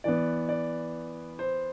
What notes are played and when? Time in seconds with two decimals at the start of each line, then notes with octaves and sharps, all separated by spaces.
0.04 E3 B3 D5
0.49 D5
1.39 C5